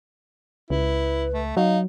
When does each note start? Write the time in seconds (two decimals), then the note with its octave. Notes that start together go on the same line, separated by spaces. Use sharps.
0.70 C#2 E4 B4
1.33 A3
1.57 F#3 D#4 F5